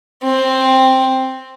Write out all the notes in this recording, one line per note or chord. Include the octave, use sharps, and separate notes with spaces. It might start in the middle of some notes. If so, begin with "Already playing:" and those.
C4